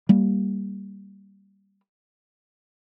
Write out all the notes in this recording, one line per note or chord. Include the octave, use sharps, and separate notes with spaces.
G3 A#3